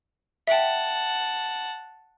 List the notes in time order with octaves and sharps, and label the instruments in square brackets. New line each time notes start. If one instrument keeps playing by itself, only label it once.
[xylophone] E5 G5 [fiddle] F#5 A5